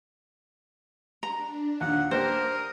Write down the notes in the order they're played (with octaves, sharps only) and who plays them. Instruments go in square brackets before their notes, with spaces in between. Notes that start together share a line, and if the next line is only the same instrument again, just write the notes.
[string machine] D4 [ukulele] A#5
[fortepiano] D#2 A#2 [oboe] F#5
[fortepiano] A#3 D4 G4 [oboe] A#4 [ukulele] C5 [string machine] D#6